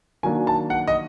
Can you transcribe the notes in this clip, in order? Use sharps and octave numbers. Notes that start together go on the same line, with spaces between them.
D#3 F#3 A#3 D4 G#5
A5
F#5
D#5